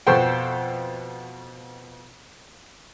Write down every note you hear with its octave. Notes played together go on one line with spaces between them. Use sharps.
F2 B2 F#4 A4 C5 G5